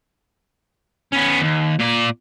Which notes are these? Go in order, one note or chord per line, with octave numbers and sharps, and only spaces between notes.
B3 C#4
D#2
A#2 D5